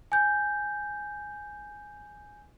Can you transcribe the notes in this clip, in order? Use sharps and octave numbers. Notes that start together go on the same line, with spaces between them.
G#5 G6